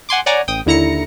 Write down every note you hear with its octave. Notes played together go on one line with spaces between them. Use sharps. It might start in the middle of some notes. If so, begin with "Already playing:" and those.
F#5 G#5 C6 D6
C#5 D5 F#5 G#5 A#5 D6
A1 G5 D#6
D#2 D3 E4 A#5 A#6 C#7